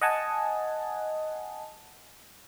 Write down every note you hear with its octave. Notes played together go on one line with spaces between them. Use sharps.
D#5 F#5 G#5 A5